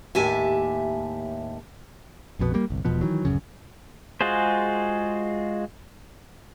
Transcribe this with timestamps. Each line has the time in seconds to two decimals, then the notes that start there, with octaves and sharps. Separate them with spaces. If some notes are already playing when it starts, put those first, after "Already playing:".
0.15 D#2 A2 G4 E5 G#5 A5
2.39 A#1 F2 B2 B3
2.54 G3 A#3
2.70 G1 C2
2.85 E1 B2 F3 B3
3.01 D#3 E3 F#3
3.25 D1 F#2 C#3
4.21 G#3 F4 F#4 G#4 C5